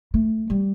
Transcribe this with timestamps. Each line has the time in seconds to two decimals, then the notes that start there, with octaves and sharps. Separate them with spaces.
0.14 A3
0.50 G3